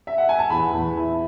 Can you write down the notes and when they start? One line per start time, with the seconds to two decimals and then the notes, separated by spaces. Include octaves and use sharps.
0.07 E5
0.18 F#5
0.29 G#5
0.39 A5
0.49 E2 B5
0.73 E2
0.97 E4